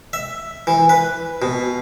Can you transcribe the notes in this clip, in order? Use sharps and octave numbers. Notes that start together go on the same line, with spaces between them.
E5
E3
B4
B2